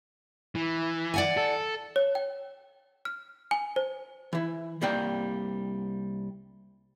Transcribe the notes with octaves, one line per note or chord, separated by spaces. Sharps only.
E3
D5 F#5 G#5
A4
C#5
G5
F6
G#5
C5
E3 E4
C2 G3 A#3 G5